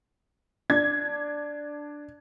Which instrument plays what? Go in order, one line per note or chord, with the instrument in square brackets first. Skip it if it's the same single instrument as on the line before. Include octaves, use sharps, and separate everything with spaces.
[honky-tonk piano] D4 G#6